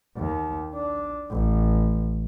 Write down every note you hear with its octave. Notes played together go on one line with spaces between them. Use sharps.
D#2
D4
A1